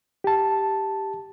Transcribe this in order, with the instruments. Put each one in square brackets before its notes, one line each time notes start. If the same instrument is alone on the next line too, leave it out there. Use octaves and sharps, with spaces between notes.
[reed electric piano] G4 A5